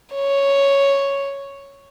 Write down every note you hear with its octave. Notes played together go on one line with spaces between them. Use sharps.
C#5